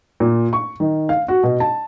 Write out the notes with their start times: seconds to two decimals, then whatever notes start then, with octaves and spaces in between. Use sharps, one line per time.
0.20 A#2
0.53 C#6
0.80 D#3
1.09 F5
1.28 F#4
1.43 B2
1.60 A5